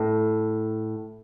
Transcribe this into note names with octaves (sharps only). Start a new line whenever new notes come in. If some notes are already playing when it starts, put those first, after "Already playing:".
Already playing: A2